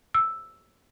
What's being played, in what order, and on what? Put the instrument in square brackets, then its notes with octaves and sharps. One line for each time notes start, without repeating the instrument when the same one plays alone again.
[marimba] E6